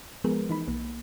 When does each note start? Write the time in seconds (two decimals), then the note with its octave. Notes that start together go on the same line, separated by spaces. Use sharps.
0.24 F3 G#3 B3 G#4 A#4 B4
0.49 E3 D#4 B5
0.67 B1 A#3